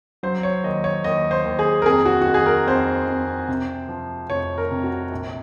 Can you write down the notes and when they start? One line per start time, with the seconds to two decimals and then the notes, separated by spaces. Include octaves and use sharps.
0.23 F#3 C5
0.43 C#5
0.63 D#2 D#5
0.84 C#5
1.04 D#2 D#5
1.31 C5
1.45 D#2
1.59 G#4
1.82 A#4
1.86 F2 G#4
2.05 F#4
2.21 F#4
2.27 D#3
2.34 G#4
2.46 A#4
2.67 F2 C5
3.07 F2
3.48 C3
3.89 F3
4.29 F1 C#5
4.58 A#4
4.71 C3
4.84 F#4
5.12 A#1